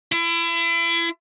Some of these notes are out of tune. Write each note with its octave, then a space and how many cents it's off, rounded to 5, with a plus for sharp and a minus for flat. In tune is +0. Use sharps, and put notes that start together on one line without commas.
E4 +35